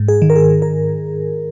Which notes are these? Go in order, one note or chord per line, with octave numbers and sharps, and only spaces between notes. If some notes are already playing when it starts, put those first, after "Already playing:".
Already playing: G#2
G#4
D#3
A#4
G#4
A#4